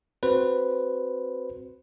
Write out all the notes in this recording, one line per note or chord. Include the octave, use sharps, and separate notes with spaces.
C4 F#4 B4 C5